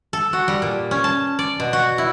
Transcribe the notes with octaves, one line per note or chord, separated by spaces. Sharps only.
A4
F#4
G3
A#2
C#4
A5
D5
B2
F#4
E4